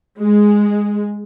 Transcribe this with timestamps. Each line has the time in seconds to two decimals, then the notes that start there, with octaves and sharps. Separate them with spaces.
0.21 G#3